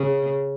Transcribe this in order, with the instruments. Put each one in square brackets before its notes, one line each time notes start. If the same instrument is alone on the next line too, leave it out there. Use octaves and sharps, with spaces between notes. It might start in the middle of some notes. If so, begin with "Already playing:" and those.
Already playing: [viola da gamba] C#3